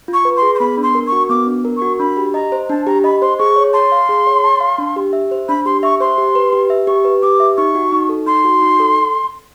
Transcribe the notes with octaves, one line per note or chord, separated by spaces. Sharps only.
F4
C#6
B4
C6
G#4
C6
B3 B5
D4
C6
A#4
C#6
F#4
B3 D6
D4
A#4
F#4 C#6
D4 B5
G4
D#5 A#5
C5
D4 A5
G4 A#5
D#5 B5
C5 C6
G#4 C#6
C#5
A5 C6
F5
G#4
C#5
A5
F5
D4
G4
E5
C5
D4 B5
G4 C6
E5 C#6
C5 C6
G4
B4
G4
E5
G4 C#6
B4
G4 D6
E5
D#4 C#6
F#4
D#4
A4
D#4 C6
F#4
D#4
A4